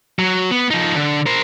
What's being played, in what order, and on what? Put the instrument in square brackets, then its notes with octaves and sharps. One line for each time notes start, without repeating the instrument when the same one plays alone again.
[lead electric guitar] F#3
B3
F3 D#4
D3
A#4 C5